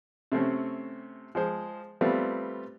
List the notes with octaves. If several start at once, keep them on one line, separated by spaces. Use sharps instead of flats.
C3 A3 C4 C#4
F3 G#3 C5
G3 A3 B3 C4 F4